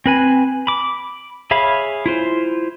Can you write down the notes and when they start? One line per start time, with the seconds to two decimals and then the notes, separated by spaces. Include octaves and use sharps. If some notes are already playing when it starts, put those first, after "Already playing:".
0.06 C4 B4 G#5
0.67 B5 D6
1.51 G#4 C#5 E5 F5 B5
2.06 E4 F4 C5